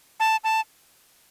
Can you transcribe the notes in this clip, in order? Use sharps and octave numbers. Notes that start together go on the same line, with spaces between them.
A5
A5